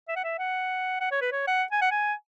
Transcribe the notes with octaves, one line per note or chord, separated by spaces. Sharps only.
E5
F#5
E5
F#5
F#5
C#5
B4
C#5
F#5
G#5
F#5
G#5